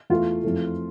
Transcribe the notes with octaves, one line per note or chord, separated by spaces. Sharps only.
E2 E3 A3 F4
F2 E3 A3